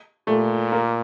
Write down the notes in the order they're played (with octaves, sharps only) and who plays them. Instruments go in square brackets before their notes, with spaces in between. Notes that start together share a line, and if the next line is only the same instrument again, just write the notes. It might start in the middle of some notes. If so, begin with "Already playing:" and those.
[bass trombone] A#2 [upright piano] A3
[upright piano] A#3